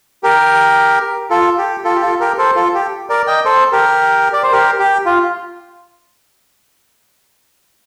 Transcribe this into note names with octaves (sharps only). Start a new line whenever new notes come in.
G4 A#4
F4 A4
G4
F4 A4
G4
F4 A4
G4 A#4
A4 C5
F4 A4
G4
A#4 D5
D#5 G5
A4 C5
G4 A#4
D5
C5
G4 A#4
G4
F4